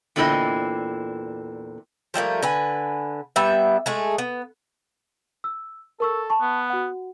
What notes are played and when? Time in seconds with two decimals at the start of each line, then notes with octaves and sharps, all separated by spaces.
0.16 E2 A#2 D3 C4 E4 D#5
2.14 F3 G3 A3 A#3
2.42 D3 B4 G#5
3.36 G3 B3 E5
3.86 G#3 A3 G#4
4.18 B3
5.44 E6
6.00 A4 A#4 C#6 E6
6.30 A5 C#6
6.41 B3
6.70 F#4 F#5